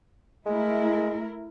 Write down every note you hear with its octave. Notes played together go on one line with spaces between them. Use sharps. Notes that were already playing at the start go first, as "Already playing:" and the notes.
G#3 A3 E4 A#4